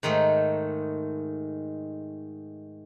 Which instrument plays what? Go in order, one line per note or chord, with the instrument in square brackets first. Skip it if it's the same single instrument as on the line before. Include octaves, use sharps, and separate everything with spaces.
[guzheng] G#2 D#3 G#3 A3